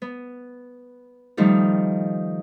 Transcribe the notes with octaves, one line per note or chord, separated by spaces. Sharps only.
B3
D#3 F3 G3 A3 D#4